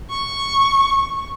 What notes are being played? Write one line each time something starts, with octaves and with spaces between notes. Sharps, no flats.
C#6